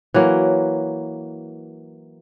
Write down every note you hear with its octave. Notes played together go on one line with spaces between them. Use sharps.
E3 F#3 A#3